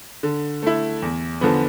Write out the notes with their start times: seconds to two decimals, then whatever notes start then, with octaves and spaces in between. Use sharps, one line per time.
0.23 D3
0.63 A3 E4
1.02 E2
1.41 D3 F3 B3